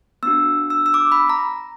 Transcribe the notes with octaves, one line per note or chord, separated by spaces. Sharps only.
B3 D4 F#4 E6
E6
E6
D6
B5
A#5